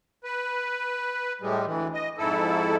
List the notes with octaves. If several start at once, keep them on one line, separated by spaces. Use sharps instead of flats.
B4
A2 G3 G#3
D2 E3
D#5
F2 G#2 E4 A4